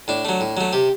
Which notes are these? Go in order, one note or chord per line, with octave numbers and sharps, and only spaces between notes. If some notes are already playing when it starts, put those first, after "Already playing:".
A2 D4
F#3 A3
A2
F#3 A3
C3 G4